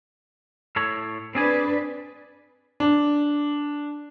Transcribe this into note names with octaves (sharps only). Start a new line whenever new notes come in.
A2 A4 C#5
C4 D4 G#4 B4 G#5
D4